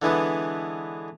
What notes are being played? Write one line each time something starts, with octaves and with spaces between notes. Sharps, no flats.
D3 E3 G#3 B3